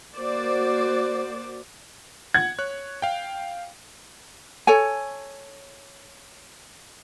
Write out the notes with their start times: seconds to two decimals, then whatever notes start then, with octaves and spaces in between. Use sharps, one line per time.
0.16 A#3 F#4 C5 D5
2.34 F#5 G#6
2.59 C#5 F#6
3.02 F5 G5
4.67 A4 C#5 G#5